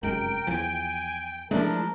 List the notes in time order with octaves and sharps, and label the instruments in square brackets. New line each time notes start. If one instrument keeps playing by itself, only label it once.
[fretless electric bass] F1 F#2 G#3 [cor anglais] A#4 [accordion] G5
[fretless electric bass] E2 F3 [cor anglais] G#5
[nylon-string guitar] F3 D4 E4 [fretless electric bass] G#3 A3 [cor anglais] A#4